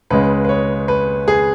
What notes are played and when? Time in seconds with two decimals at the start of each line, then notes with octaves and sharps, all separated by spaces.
0.10 C#2 C#3 G#3 B4
0.45 B4
0.49 C#5
0.88 B4
1.28 G#4